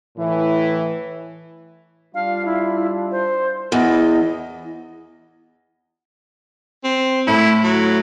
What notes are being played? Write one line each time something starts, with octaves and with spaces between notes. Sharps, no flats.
A2 E3
G3 D4 F4 F5
E4
C5
E2 B3 E4 G#4 D#5
C4
A2 E4
F#3